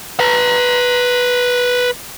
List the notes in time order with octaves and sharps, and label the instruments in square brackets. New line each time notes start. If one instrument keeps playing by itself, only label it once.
[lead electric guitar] B4 A#5